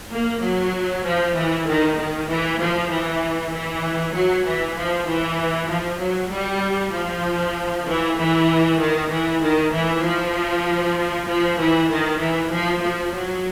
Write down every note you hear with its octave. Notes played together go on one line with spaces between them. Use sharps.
A#3
F#3
F3
E3
D#3
D#3
E3
F3
E3
E3
F#3
E3
F3
E3
F3
F#3
G3
F3
E3
E3
D#3
E3
D#3
E3
F3
F3
E3
D#3
E3
F3
F3
F#3